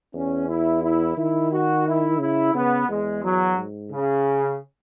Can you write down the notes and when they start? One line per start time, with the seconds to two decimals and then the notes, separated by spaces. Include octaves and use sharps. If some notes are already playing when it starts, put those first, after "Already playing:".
0.14 E2 C#4
0.48 E4
0.82 E4
1.17 D#3 E4
1.51 F#4
1.86 E4
2.19 C#3 E4
2.54 C#3 B3
2.88 E2 G#3
3.23 F#3
3.57 G#2
3.92 C#3